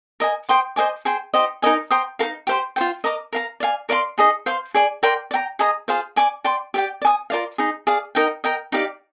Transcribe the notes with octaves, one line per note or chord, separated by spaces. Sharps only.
A#4 D#5 G#5
C5 G5 C6 D#6
C5 D#5 G#5 D6
G#4 C5 G5
D#4 G4 C5 D#5
D#4 A#4 D#5 G#5
C5 G5 A#5 D#6
D#4 A#4 F5
G4 C5 F5 C6
F4 C5 G5
A#4 D#5 A#5 D6
A#4 F5 A#5
D5 F5 G#5
A#4 D5 F5 C6
D#4 G#4 D#5
C5 F5 C6
G#4 D5 G#5
A#4 D5 G5 C6
D5
G5 A#5
G#4 D#5 A#5 D#6
F4 G#4 C5 F5
D5 G#5 D6
D5 G5 C6
G4 D5 G5
D5
G#5 D#6
F4 A#4 D5 F5
D#4 G#4 D#5
G#4 D5 F5
D#4 A#4 D#5 G5
A#4 D#5 G5
D#4 G4 D5 F5